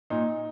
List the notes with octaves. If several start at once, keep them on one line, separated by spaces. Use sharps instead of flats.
A#2 D#4